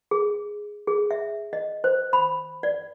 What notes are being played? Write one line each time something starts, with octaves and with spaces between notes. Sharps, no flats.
G#4
G#4
E5
D#5
C5
B5
D5